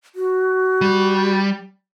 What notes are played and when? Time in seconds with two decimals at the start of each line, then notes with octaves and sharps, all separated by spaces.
0.15 F#4
0.81 G3